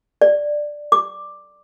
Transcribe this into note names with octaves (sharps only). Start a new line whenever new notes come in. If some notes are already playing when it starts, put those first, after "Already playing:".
D5
D6